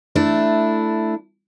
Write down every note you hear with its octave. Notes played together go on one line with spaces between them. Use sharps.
A3 D4 E4